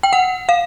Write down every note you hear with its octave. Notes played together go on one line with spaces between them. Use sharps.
G5
F#5
F5